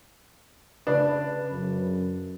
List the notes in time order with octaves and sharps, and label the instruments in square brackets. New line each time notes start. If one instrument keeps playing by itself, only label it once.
[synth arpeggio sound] C#3 B4 [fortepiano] D4
[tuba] F#2